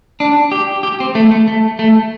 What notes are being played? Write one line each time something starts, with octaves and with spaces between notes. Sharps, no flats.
D4
G4
G4
C4
A3
A3
A3
A3